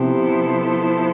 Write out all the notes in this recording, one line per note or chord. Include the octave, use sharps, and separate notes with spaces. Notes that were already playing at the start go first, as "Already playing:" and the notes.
Already playing: C3 F3 B3 E4 A4 C5